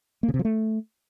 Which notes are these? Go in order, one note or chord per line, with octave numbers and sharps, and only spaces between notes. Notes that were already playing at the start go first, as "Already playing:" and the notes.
A#3
C#3
C3
F3
A3